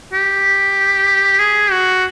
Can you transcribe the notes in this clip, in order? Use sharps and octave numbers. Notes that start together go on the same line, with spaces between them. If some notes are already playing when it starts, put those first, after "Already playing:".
G4
G#4
F#4